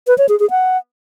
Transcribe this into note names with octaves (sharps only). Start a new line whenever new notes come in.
B4
C#5
G#4
G#4
F#5